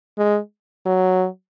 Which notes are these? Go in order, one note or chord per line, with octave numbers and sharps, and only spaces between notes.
G#3
F#3